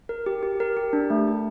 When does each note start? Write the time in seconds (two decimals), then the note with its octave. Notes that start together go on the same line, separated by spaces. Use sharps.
0.09 A#4
0.26 G4
0.43 G4
0.60 A#4
0.77 G4
0.93 D4
1.10 A3
1.27 G4